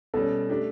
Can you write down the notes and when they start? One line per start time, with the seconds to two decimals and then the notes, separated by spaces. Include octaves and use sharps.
0.14 B2 G3 C#4 A4
0.49 A3 D4 G4